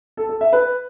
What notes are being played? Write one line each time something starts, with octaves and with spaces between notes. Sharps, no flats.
A4
A4
E5
B4